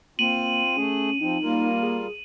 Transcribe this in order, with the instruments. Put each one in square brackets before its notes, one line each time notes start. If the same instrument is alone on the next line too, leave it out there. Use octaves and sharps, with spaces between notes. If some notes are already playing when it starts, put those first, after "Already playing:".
[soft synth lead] A#3 [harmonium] C4 F4 [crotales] D#7 F#7
[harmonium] A3 G#4 [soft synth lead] C#4
[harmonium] F3 C4 [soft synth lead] D#4
[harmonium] G3 F4 A#4 [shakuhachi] A#3
[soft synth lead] G#4